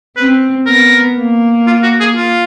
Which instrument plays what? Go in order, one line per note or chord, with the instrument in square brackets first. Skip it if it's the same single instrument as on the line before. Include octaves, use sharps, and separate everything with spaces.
[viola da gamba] C4 [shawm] B4
[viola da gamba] B3 [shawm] A#4
[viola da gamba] A#3
[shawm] F4
F#4
G#4
F4